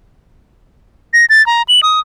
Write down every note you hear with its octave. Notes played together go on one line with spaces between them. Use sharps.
A#6
A6
A#5
F#7
D#6